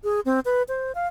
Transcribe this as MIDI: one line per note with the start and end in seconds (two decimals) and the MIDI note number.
0.04 0.20 68
0.25 0.40 60
0.45 0.63 71
0.69 0.92 72
0.95 1.07 77